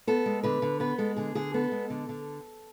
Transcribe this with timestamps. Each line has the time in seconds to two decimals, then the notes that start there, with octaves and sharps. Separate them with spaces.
0.07 B3 A4
0.26 G#3
0.43 D3 B4
0.62 D3
0.80 B3 B4
0.98 G#3 A4
1.16 D3 G#4
1.35 D3 G#4
1.54 B3 A4
1.72 G#3
1.90 D3
2.09 D3